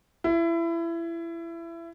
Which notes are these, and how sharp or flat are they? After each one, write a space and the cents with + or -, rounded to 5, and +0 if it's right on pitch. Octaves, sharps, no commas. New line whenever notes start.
E4 +25